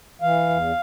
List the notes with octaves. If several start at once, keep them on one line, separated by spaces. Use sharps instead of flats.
E3 F5
E2